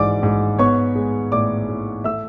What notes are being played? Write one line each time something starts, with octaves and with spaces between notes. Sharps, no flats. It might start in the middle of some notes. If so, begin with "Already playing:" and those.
Already playing: G#2 E3 D5 D6
G#2
B3 C#5 C#6
G#3
A2 D5 D6
A2
A3 E5 E6